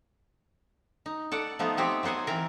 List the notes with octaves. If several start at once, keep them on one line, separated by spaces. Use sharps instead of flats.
D#4
A4 D5 F#5
F3 A3 B3 D#4
B3 C4 G4 C5 C#5
F#3 B3 C5 F#5 G#5
E3 C4 A#4